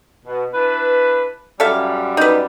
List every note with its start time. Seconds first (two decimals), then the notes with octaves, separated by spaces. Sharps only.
0.26 B2
0.54 D4 E4 B4
1.60 F#2 G3 A4 E5 F5
2.17 D#4 B4